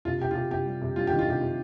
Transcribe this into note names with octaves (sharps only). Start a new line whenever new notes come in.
C3 F4
C3 G4
F4
C3 G4
C3 G4
G3
C3
G3 F4
G4
D#3
F4
C3 G4
C3